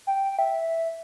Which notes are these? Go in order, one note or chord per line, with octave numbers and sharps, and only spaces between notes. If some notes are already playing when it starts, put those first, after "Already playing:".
G5
E5